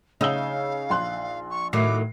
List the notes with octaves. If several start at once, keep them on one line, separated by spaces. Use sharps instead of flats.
C#3 D#4 F5 E6 G7
A#1 C6 F#6
C#6
A2 D#3 F#3 D6 C7